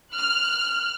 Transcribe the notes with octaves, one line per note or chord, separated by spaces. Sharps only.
F6 F#6